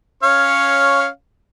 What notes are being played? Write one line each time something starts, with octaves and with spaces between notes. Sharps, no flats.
C#4 C#5 F5